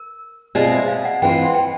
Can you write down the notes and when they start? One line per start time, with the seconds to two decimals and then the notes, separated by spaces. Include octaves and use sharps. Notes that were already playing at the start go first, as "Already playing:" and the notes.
Already playing: A#4
0.55 B2 G#3 C4 F4 G#4 D5
0.72 E5
0.88 F5
1.05 F#5
1.22 E3 G#3 C4 F4 G5
1.38 F#5
1.55 G5